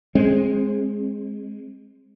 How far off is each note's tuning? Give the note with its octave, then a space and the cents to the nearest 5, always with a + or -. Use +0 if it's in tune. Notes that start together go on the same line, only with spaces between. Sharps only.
G#3 -5 C4 +25